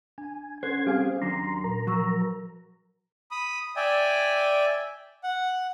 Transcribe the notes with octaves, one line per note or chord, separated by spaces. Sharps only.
D4 G#5
C#4 A4 C5 F#5 C6 G#6
G3 C4 G4 G#4 F5
D#2 F#3 D4 A#5 C6
A#2 A#4 A#5
F3 F#3 C#6 E6
B5 D#6
D5 E5 G5 G#5
F#5